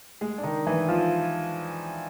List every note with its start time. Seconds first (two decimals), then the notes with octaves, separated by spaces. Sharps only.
0.21 G#3 G#4
0.38 D4
0.43 D#3 D#4
0.67 E3 E4
0.88 F3 F4